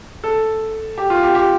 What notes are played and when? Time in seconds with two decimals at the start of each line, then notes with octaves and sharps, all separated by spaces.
0.24 A4
0.98 G4
1.10 F4
1.23 G4
1.35 G4